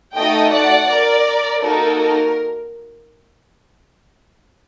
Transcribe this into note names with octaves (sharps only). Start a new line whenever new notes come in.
A3 D#4 F#4 A4 D#5 G5
D5 F#5
A#4 D5
A#3 D#4 F#4 A4 A#4
A#4